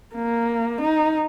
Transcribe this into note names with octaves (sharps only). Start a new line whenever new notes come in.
A#3
D#4